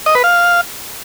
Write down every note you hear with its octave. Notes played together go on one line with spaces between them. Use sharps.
D#5
B4
F5